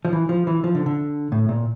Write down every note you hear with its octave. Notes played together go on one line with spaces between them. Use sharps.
F3
E3
F3
E3
F3
D3
D3
A2
A#2